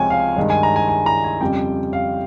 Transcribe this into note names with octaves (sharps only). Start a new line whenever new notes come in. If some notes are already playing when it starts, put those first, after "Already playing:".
Already playing: C#2 C3 F3 G#3 C#5 G5 G#5
F5
G2 D#3 G#3
G#5
A#5
G#5
G#5
A#5
G#5
F2 C#3 G3 G5
F5